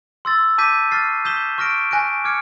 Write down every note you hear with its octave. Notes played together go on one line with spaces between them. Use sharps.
C6 E6 A6
A5 D6 G6 B6 D#7
C#6 F6 A6 C7
D#6 G6 B6 E7 G7
C#6 F6 A#6 D7
G#5 C#6 F#6 A#6 D7
D6 F6 G#6 C#7